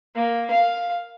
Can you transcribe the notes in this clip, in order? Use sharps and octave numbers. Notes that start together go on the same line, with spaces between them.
A#3
F5